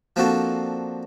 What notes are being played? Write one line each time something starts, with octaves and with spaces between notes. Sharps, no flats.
F3 A#3 C4 D4 F#4 A4